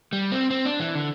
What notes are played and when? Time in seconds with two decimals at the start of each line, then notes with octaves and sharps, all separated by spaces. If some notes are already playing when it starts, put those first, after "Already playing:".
0.13 G3
0.32 C4
0.51 C4
0.65 D4
0.80 E3
0.95 D3